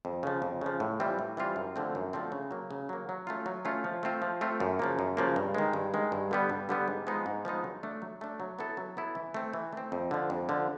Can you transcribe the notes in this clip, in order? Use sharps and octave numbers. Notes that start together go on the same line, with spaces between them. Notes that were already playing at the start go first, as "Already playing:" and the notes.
F2
C#3 F3
F2
C#3 F3
A2
E3 G3 C4 F4
A2
E3 G3 C4 F4
F#2
D3 F3 A3 C4
F#2
D3 F3 A3 C4
C#3
F#3 A#3
C#3
F#3 A#3
F#3
A3 C#4 F4
F#3
A3 C#4 F4
F3
A3 C4 F4
F3
A3 C4 F4
F#2
C#3 F3 A#3
F#2
C#3 F3 A#3
G2
D#3 G#3
G2
D#3 G#3
G2
D3 G3 B3
G2
D3 G3 B3
G#2
F3 G#3 B3 D#4
G#2
F3 G#3 B3 D#4
F#3
A3 D4
F#3
A3 D4
F#3
B3 E4 A4
F#3
B3 E4 A4
E3
A3 C4
E3
A3 C4
F2
D3 F3
F2
D3 F3